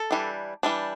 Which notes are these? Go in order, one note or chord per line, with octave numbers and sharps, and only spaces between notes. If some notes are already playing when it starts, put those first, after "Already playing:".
Already playing: A4
E3 G3 D4
E3 G3 D4